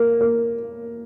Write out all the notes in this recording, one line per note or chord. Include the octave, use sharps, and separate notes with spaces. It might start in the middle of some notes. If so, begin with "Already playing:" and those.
Already playing: A#3
A#3